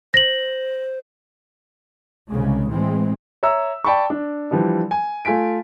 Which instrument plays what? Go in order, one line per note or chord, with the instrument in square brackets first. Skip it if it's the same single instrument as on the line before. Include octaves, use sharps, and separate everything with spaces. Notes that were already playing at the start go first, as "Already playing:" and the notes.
[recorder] C5 [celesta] A#6 F#7
[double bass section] C2 C#3 G#3
A2 E3 G#3 C4
[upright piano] C#5 E5 A#5 E6
D5 G5 A5 B5 C#6
D4
E3 F3 G3 D4
G#5
A3 F4 G#5 B6 D7